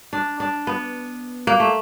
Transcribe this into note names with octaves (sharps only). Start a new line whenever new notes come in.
D4
D4
B3
A#3
A3